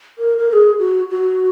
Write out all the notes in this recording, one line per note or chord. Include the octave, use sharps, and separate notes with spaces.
A#4
A#4
A#4
G#4
F#4
F#4